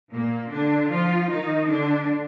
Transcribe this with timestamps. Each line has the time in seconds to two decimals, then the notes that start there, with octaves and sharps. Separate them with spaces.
0.12 A#2 A#3
0.52 D3 D4
0.91 F3 F4
1.30 D#3 D#4
1.69 D3 D4